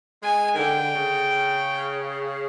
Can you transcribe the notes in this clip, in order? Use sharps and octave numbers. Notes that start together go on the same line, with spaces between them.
G#3 G#5
D#3
D3 G5
C#3